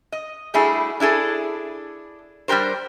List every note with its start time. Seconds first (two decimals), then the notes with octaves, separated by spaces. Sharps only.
0.12 D#5
0.54 G3 A3 D4 E4 F#4 G#4
1.00 D4 E4 G#4 A4
2.48 G3 D4 G4 A#4 C5